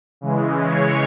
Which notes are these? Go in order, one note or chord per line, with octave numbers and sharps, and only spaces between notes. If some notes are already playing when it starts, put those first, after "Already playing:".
C#3 E3 G#3
C#5